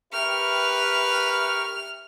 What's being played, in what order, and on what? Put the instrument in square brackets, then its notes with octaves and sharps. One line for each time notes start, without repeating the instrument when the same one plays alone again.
[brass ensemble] G4 E5 [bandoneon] A#4 G5 C#6 [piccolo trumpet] B4 [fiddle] F6